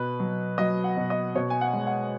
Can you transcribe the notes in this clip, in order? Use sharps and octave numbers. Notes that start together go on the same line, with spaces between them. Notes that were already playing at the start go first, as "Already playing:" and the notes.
Already playing: B2 B4
F#3
F#3 D#5
F#5
B2
D#5
B2 C#5
G#5
F#5
G#3
F#5